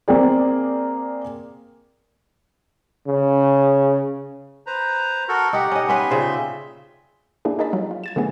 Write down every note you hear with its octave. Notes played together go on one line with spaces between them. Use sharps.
A#3 C4 G#4 D5
C#3
B4 C5 A#5
F#4 A4 A#4
D#4 G4 F#5
C#4 D#5
B3 C#4 B4 E5 C6
A#2 C#3 C5
A#3 D4 E4 G#4 A4
D#4 G#4 A#4 D#5 A5 B5
F#3 G3 F4
F4
G#6 A6 E7
D3 D#3 F#3 A3 B3 G#4